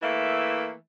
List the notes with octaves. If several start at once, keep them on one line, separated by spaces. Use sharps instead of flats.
E3 A3 A#3 E5